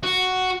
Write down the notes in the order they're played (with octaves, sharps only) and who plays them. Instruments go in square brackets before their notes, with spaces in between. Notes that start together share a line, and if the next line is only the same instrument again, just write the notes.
[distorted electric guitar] F#4